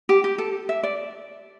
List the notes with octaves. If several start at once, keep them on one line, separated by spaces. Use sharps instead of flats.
G4
G4
A4
E5
D5